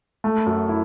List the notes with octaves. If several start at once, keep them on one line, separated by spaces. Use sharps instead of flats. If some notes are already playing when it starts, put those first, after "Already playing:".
A3
F#2
E4